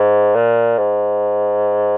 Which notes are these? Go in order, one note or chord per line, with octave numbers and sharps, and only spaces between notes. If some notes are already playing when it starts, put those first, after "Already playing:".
Already playing: G#2
A#2
G#2